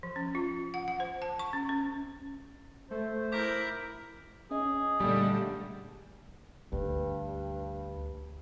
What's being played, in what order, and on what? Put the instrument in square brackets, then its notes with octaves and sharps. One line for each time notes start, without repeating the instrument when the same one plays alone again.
[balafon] F3
C#4
F4
F#5
F#5
C5
A5
C#6
C#4
C#4
[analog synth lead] A3 [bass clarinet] C5
[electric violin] E4 A#4 [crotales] D6 G6 B6
[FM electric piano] C#4 D#5 [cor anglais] G#4
[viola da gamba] A#2 D3 A3 [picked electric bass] G3
[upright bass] D2 [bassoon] G2